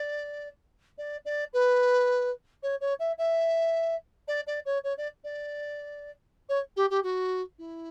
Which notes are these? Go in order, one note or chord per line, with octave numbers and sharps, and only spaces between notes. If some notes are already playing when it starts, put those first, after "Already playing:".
Already playing: D5
D5
D5
B4
C#5
C#5
E5
E5
D5
D5
C#5
C#5
D5
D5
C#5
G4
G4
F#4
E4